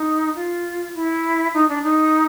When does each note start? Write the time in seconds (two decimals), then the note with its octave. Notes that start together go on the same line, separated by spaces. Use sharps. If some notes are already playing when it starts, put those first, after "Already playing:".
Already playing: D#4
0.36 F4
0.95 E4
1.54 D#4
1.69 D4
1.83 D#4